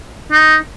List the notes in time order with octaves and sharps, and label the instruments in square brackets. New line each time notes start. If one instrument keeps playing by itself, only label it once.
[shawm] D#4